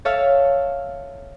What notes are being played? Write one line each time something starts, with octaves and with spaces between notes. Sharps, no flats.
A4 C#5 E5 F5